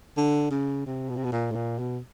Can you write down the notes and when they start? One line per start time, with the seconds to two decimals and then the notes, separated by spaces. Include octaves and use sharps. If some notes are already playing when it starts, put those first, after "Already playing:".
0.17 D3
0.51 C#3
0.86 C3
1.09 B2
1.16 C3
1.24 B2
1.32 A#2
1.51 A2
1.55 A#2
1.79 B2